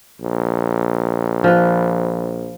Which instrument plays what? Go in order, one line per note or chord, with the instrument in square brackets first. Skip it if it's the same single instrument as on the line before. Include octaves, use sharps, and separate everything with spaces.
[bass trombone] A#1
[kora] F3 B4